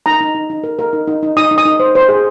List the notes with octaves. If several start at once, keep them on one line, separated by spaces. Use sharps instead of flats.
D#4 A#5
D#4
D#4
D#4
A#4
A#4
D#4
D#4
D#4
D#4 D#6
D#4
D#6
D#4
C5
C5
G#4